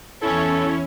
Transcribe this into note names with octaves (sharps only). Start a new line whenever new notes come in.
E2 C#4 E4 A4 C#5